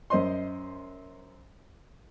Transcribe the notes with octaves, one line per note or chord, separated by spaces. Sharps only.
F#2 C5 D#5 C6